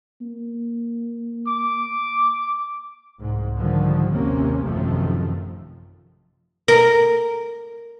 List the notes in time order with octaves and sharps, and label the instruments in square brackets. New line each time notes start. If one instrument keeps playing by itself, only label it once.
[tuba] A#3
[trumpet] D6
[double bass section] C2 G#2
G#2 D3 D#3 F3 G3
G#1 D#2 C3 A#3 C#4
A1 F#2 C3 D#3 F3 A3
[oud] A#4